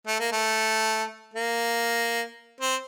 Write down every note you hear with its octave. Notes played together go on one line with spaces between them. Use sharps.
A3
A#3
A3
A#3
C4